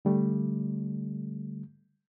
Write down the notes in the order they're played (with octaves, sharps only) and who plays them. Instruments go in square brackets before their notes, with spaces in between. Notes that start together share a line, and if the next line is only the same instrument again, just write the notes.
[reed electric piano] D3 G3 A3